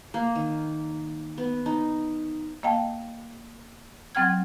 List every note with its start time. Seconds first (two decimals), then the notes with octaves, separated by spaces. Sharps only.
0.14 A#3
0.35 D#3
1.38 B3
1.66 D#4
2.63 A#3 D#5 F5 G5 A5
4.15 F#3 C4 F#5 G5 F6 G#6